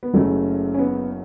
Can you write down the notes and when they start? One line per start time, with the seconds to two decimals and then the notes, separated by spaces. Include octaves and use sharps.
0.03 B3
0.13 F#1 F#2 C#3 F#3 A3
0.74 C#4
0.79 B3